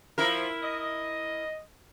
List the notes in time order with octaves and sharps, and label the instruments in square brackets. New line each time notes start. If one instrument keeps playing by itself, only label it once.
[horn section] F3 [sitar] E4 A#4
[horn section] D#5